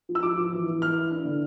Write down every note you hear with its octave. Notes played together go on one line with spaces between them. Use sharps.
F3
E6
F3 D6
F3
E3
E3
E3 F6
E4
D4
D3